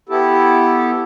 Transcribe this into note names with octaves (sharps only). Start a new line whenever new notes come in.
B3 E4 G4 A4